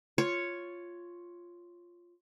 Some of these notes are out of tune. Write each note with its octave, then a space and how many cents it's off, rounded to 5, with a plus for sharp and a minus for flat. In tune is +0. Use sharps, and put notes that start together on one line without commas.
F4 +0 C#5 +0